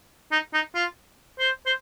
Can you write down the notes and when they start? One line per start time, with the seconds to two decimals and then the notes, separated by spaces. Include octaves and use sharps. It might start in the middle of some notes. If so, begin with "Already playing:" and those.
0.32 D#4
0.53 D#4
0.75 F4
1.39 C5
1.66 C5